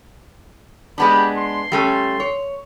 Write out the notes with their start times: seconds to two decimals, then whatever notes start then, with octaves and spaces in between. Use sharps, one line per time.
0.98 G#3 B3 D4 G4 B5
1.36 C6
1.72 G3 A3 C#4
2.20 C#5